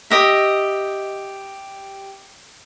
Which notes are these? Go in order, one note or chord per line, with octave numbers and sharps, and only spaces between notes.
G4 D#5 E5